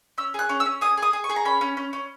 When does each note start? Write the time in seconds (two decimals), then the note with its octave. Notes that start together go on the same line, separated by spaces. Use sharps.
0.18 C#4 E6
0.34 G#4 F#6
0.49 C#4
0.60 E6
0.66 C#4
0.81 G#4 D#6
0.97 G#4
1.02 D#6
1.13 G#4
1.24 C#6
1.29 G#4
1.36 A#5
1.45 C#4 B5
1.61 C#4
1.77 C#4
1.93 C#4